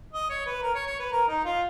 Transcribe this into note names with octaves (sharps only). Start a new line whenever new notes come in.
D#5
C#5
B4
A#4
C#5
C#5
B4
A#4
D#4
F4